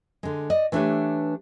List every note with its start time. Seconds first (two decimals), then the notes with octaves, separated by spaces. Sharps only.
0.23 D3 G#3
0.50 D5 D#5
0.72 E3 A3 D4 G4 B4 C#5